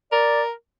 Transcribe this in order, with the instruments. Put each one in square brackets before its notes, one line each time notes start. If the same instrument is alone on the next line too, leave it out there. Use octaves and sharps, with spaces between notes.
[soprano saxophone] A#4 [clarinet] D5